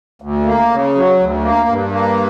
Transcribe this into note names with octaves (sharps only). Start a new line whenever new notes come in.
D2
A#3
C#3
F#3
D2
A#3
G2
A#3